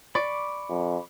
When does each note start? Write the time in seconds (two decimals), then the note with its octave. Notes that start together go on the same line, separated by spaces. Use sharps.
0.15 D5 B5 C#6 D6
0.69 F2